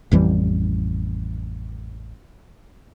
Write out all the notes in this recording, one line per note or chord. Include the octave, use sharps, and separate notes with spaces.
A1 F2 E3 G3